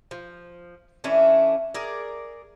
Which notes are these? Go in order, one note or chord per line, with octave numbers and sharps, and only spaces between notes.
F3
E3 A3 C#4 D4
G#4 A#4 D5